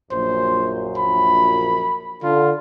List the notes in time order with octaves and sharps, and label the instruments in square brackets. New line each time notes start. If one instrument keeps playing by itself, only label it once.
[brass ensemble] A#1 F#2 [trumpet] C5
[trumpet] B5
[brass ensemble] D3 [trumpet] F4